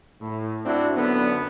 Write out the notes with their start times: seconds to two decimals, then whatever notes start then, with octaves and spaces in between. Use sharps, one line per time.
0.21 A2
0.66 C4 D4 E4 F#4
0.96 F#2 D3 B3